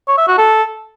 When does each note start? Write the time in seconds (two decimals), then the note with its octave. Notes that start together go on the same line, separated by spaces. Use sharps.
0.07 C#5
0.18 E5
0.28 F#4
0.38 A4